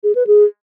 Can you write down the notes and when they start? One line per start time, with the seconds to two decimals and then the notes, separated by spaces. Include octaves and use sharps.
0.03 G#4
0.15 B4
0.27 G#4